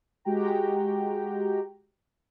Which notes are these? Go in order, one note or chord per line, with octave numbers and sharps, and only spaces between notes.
G#3 F#4 G4 G5 A#5